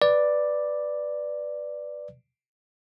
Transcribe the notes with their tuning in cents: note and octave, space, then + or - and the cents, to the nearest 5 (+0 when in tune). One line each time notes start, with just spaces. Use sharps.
B4 +0 D5 +5